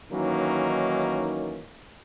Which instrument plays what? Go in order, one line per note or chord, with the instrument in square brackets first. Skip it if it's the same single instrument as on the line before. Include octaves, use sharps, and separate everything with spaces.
[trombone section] D#3 E3 F#3 A#3 C#4 D#4